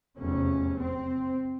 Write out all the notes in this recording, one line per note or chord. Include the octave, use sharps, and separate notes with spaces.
F1 E2 C3 C#4
C4